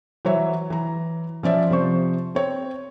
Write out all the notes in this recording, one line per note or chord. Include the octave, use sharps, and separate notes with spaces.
E3 F#3 C#5 E5
E3 A#5
F3 C#4 D5 E5
C3 F3 C5 C#6
C4 C#5